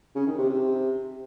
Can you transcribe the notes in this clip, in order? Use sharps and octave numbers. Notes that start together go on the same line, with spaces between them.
C#3
D#3
C3
C3